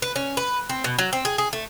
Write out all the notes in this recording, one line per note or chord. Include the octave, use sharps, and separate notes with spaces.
B4
C#4
B4
C4
B2
F#3
C4
G#4
G#4
A3